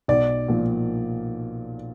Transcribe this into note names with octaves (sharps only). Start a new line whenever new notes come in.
B1 D5
A#2 F3